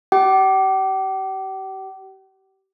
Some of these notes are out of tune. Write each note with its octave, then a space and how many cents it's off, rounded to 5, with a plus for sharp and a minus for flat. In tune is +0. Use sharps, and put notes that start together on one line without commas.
G4 -30 G5 -45 D6 +0